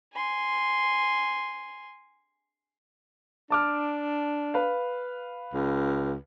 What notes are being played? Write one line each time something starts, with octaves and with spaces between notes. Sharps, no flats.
G#5 C6
D4 A5 D6 F6
B4 F5
C#2